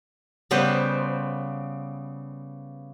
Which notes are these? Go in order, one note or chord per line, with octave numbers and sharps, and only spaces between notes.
C#3 G3 B3 B4 C5